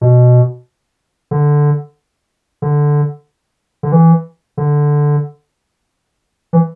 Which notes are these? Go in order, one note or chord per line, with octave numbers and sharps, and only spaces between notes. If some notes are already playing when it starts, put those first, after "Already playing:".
B2
D3
D3
D3
E3
D3
E3